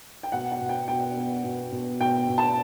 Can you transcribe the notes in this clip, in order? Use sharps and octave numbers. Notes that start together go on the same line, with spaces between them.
G5
B2 F#5
F#5
B2
G5
B2 G5
B3
B2
B2
B2 G5
B2
A5